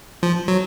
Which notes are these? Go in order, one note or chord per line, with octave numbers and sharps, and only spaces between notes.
F3
F#3